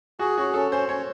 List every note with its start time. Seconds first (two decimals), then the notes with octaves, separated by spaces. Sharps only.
0.19 F#4 G#4
0.38 C#4 F#4
0.54 C#4 A4
0.71 C#4 C5
0.89 C#4 C#5